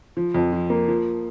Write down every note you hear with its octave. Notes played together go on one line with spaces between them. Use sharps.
F3
F2
F3
A#3
F3